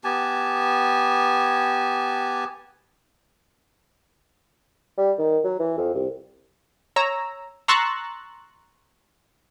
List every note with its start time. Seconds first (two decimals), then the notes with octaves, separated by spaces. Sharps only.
0.04 B3 G4 G#5 A5
4.97 G3
5.18 D#3
5.44 F#3
5.59 E3
5.77 F2
5.94 C2
6.96 C#5 A#5 E6
7.68 A#5 C6 C#6 E6 F#6 A6